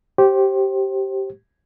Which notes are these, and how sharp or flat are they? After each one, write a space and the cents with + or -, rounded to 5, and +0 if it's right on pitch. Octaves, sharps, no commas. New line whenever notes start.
G4 -15 C5 +25